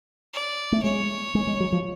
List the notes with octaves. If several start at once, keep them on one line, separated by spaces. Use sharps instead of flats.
D5
A3
G#3 C#5
G#3
G#3
F#3
F3